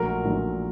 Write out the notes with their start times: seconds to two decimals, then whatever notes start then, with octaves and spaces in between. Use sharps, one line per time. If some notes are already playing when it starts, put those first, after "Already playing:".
Already playing: A#1 A#2 F#3 A3 A#4
0.25 A#1 A#2 F#3 A3